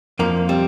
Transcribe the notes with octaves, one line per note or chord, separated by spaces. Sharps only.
F2 F3 A#3
G3 C4